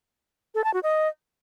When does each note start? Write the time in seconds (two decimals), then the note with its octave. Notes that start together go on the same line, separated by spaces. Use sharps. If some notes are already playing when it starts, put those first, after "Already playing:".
0.55 A4
0.64 A5
0.74 F#4
0.83 D#5